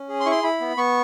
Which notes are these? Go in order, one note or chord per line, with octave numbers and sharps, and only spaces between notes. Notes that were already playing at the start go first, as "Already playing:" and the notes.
Already playing: C#4
G#4
C6
E4 C#6
C6
E4 B5
B3
B3 C#6